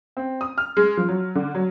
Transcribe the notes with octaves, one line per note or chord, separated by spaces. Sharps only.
C4
D#6
F6
G#3
F3
F#3
D3
F#3